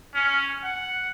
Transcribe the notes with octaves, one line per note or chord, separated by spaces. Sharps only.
C#4
F#5